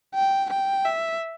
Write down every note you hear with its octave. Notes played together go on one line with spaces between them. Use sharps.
G5
G5
E5